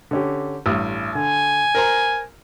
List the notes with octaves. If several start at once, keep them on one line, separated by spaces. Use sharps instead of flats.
D3 C#4 G4
A1 G2
D3 G#5
A#4 C5 A#5